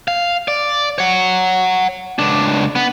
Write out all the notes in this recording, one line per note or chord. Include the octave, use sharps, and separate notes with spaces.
F5
D5
C#5 F#5
C#2 D4
B3